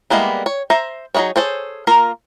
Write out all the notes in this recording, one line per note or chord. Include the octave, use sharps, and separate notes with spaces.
G3 G#3 A#3 B3 E4
C#5
C5 E5 A#5
F#3 D#4 E4 G#4 C#5
G#4 A4 C5 C#5
A#3 F4 A#4